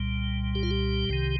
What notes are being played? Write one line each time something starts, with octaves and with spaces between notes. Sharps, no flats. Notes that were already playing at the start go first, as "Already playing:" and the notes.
Already playing: C2 A#2 G3
G4
F4
G4
C2 C3 D#3